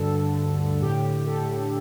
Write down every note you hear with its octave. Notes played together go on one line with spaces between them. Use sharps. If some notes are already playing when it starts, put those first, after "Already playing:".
Already playing: D2 G2 D3 A4
D3
D3
A2 G4
A2
A4
A2